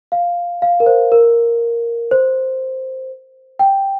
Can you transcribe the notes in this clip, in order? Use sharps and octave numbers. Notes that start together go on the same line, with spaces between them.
F5
F5
A#4
C5
A#4
C5
G5